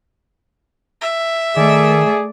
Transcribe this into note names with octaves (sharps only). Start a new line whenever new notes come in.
E5
D#3 A3 G#4 D5